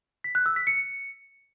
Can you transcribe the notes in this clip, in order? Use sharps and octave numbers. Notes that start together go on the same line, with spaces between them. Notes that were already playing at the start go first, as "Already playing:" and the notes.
B6
F#6
E6
B6
C#7